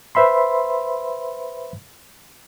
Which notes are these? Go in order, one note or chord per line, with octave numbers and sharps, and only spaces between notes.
B4 C5 E5 B5 C6